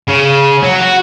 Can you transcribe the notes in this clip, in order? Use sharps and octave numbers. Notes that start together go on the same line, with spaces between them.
C#3
F#3
F#4